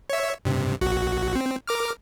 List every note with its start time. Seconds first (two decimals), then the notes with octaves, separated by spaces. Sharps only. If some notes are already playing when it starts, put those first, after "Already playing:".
0.10 C#5 E5
0.45 G2 C3
0.81 A#1 F#4
1.36 C4
1.67 A#4 D6 F6